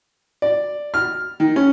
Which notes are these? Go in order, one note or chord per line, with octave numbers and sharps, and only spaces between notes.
D5
F6
D#3
C#4